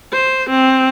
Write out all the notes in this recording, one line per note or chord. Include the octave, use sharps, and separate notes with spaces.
C5
C4